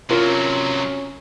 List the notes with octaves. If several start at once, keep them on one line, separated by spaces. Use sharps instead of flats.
C3 F#3 C#4 F4 A#4